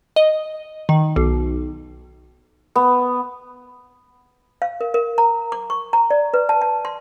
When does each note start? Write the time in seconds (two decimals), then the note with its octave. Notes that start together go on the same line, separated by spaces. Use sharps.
0.16 D#5
0.89 D#3
1.16 B1
2.75 B3
4.62 F5
4.81 A#4
4.94 A#4
5.18 A#5
5.52 D6
5.70 C#6
5.93 A#5
6.10 D5
6.34 B4
6.49 A5
6.61 A5
6.85 C6